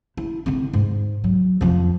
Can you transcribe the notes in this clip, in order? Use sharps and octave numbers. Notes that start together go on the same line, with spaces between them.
E4
D3 C4
G#2
F#3
F2 F3